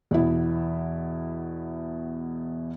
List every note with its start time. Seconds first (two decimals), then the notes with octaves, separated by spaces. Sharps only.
0.11 E2 B2 E4